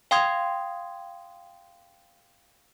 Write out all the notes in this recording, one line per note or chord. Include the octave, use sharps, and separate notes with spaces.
F5 G5 C6 D#6 G#6